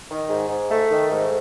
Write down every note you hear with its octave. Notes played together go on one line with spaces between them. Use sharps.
D#3
G#2
G#2
A3
D#3
G#2